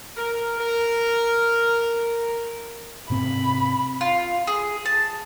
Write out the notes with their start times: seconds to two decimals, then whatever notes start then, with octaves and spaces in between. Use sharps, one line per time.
0.17 A#4
0.58 A#4
3.10 G#2 C3 C4 B5
4.01 F4
4.47 G#4
4.86 A5